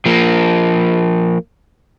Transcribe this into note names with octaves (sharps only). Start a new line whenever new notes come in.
F3 A#3